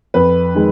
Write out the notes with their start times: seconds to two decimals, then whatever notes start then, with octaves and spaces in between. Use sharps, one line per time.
0.14 F2 B4
0.55 D#3 G#3